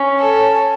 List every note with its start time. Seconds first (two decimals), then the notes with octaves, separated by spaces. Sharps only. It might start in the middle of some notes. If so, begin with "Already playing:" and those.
Already playing: C#4
0.19 A4